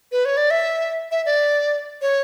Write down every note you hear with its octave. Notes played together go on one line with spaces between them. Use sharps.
B4
C#5
D5
E5
E5
D5
C#5